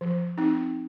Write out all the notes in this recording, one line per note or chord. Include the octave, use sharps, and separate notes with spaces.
F3
C4 D#4